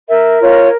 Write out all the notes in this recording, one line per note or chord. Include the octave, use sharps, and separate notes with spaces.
A#4 E5
F4 C#5